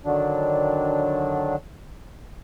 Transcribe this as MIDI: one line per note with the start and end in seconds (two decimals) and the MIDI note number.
0.05 1.55 50
0.05 1.55 51
0.05 1.55 54
0.05 1.55 62